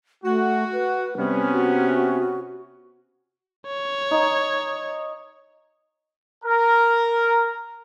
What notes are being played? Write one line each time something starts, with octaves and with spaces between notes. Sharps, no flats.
A3 F#4
B4
C3 G3 B3 C#4
F#4
C#5
D#4
A#4